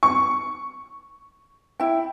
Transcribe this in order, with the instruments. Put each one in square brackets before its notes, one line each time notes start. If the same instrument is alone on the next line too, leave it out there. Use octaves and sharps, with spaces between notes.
[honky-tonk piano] C#6
[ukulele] E4 G5